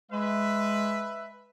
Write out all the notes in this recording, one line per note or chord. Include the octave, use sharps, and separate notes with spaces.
G#3 B4 E5